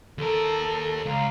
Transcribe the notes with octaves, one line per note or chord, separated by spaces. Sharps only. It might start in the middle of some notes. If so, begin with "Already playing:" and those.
D#2 A4 A#4
C#2 F5 A#5